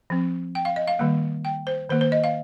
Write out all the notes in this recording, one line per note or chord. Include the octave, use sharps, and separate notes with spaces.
F3 C4
G5
F5
D#5
F5
D#3 G3 A#3
G5
C5
D#3 A#3 C5
C5
D#5
F5